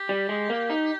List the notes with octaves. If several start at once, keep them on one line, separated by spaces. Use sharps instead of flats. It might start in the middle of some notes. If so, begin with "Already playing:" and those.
Already playing: G4
G3
G#3
A#3
D#4